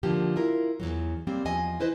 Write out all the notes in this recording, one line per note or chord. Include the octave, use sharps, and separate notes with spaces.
D3 F3 A#3 G4
E4 F4 A#4
E2 A#2 F#3
F#3 G3 A#3 C4
E2 F3 D#5 G#5
E4 B4 C5 D#5